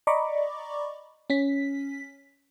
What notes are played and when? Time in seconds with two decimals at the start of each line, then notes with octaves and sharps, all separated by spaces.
0.07 D5 D#5 A#5 B5 C#6 D6
1.30 C#4 B6